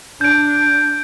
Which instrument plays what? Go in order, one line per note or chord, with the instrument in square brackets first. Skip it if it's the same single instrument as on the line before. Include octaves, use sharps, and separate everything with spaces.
[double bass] D4 [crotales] G6 D7